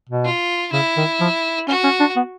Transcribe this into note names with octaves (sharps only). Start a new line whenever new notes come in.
B2
F4
C#3 E4
D#3
F3
C#4 F#4
C#4
D4
B3